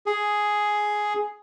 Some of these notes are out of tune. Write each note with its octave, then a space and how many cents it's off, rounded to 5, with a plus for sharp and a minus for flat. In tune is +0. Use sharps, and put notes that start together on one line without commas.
G#4 +5